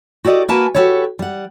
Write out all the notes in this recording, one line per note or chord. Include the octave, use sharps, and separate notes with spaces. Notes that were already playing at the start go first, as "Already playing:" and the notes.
F#4 G4 A4 D5 D#5
A#3 F#4 A#4 B4 G#5 A5
F#4 G4 A4 B4 C#5
G3 F#5